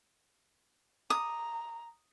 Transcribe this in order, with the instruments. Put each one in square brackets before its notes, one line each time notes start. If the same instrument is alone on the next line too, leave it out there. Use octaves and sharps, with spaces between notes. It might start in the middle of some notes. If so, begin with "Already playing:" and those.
[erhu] A#5 [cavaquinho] D#6